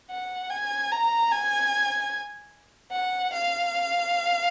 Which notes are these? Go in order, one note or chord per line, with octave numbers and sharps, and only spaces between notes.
F#5
G#5
A#5
G#5
F#5
F5